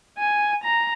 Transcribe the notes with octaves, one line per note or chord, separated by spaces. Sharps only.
G#5
A#5